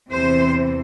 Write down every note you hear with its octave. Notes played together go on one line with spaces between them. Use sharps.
E2 C3 E3 C5